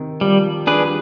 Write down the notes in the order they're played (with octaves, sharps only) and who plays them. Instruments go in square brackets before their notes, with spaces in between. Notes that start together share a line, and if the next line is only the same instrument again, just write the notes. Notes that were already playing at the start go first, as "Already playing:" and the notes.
Already playing: [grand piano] C3 D#3
[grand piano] F3 [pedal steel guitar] G3
[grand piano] F3 [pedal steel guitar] D4 G#4 B4
[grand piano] G3